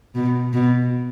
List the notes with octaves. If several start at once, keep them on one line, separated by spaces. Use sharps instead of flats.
B2
B2